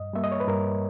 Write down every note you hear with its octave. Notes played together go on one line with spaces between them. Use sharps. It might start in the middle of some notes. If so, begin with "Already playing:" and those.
Already playing: G2 D#5
G3 A#3 E5
D#5
C#5
B4
G2 A#4